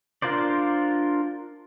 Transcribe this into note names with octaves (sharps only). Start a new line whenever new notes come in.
D4 F4 A#4 C5 D5